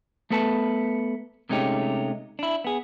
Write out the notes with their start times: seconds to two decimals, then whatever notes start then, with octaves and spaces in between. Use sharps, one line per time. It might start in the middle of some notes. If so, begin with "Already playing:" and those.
0.30 A3 B3 A4 B4 A5
1.49 C3 G#3 A3 C#4 D#4 G4
2.39 D4 E4
2.64 B3 G#4